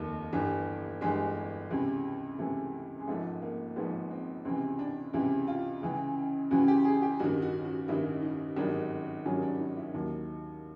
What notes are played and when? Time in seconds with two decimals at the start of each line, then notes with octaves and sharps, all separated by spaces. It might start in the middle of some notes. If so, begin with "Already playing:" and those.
Already playing: F1 D#2 D#3 A#3
0.33 G1 G2 E3
1.01 G1 G2 E3 G#3
1.70 C#2 C3 E3
2.39 C#2 C3 E3 A3
3.00 G#3
3.08 G#1 G#2 F3 A3
3.42 A#3
3.76 G#1 G#2 F3 B3
4.10 C4
4.45 C#2 C3 E3 C4
4.79 D4
5.13 C#2 C3 E3 E4
5.47 F4
5.82 C#2 C#3 E3
6.51 C#2 C#3 E3 F#4
6.68 G4
6.85 G#4
7.02 G4
7.19 A1 G2 D#3 F#4
7.42 F#4
7.65 F#4
7.88 A1 G2 D#3 E4
8.22 D#4
8.56 G#1 G2 D#3 F#3 D4
9.25 G#1 G2 D#3 F#3 C#4
9.42 D4
9.60 D#4
9.77 E4
9.94 D#2 D#3 F#3